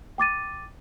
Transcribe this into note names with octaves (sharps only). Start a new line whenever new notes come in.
G5 D6 A6 D#7